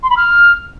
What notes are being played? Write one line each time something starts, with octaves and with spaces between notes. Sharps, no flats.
C6
B5
F6